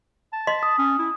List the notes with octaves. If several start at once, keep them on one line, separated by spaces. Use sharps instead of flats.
A5
D#5 C6 B6
D#6
C#4
E4